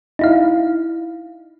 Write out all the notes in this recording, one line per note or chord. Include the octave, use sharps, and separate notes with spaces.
D#4 E4 F5